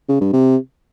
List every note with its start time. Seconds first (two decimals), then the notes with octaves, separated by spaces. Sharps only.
0.09 C#3
0.21 G2
0.33 C3